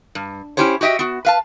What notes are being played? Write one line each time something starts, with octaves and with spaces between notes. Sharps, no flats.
G2
C#4 E4 G4 C5 C#5
F#4 G4 D#5 E5 G5
B3 F#4
B4 F5 A5